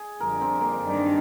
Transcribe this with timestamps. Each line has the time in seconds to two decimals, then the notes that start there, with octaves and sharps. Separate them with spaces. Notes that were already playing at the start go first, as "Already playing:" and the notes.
Already playing: G#4
0.20 F2 D3 G3 A#4
0.41 C4
0.61 A#3
0.82 G2 D#3 G3 D4